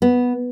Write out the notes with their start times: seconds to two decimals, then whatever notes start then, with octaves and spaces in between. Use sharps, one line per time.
0.02 B3